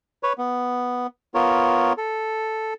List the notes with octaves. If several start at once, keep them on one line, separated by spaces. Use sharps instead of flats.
B4 C#5
B3
B3 F4 A#4 C#5
A4